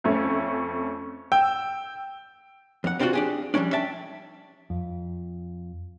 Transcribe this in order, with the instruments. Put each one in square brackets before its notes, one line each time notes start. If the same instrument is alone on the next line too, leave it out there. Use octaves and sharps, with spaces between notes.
[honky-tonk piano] F2 A3 C#4
[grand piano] G5 [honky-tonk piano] E6
[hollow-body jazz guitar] F2 F#5
B3 C4 D4 D#4 F4 F#4
D4 G4 G#4
F3 G3 A#3 C#4 D4
E5 G5 A5
[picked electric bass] F2